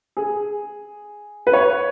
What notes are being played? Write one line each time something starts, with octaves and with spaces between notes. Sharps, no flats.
G#4
B4
C#5